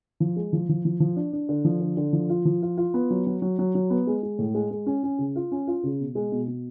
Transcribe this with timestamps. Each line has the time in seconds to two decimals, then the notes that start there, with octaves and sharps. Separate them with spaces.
0.20 F3
0.36 G#3
0.53 F3
0.69 F3
0.85 F3
1.00 F3
1.16 D4
1.33 D4
1.49 D3
1.65 F3
1.81 D3
1.97 D3
2.13 F3
2.29 F4
2.45 F3
2.62 F4
2.77 F4
2.94 B3
3.11 F#3
3.27 F#3
3.42 F#3
3.59 F#3
3.75 F#3
3.90 B3
4.07 G#3
4.23 G#3
4.39 A2
4.54 G#3
4.71 G#3
4.86 C#4
5.03 C#4
5.19 C#3
5.36 F4
5.52 C#4
5.67 F4
5.83 C#3
6.00 B2
6.15 G#3
6.32 B2
6.48 B2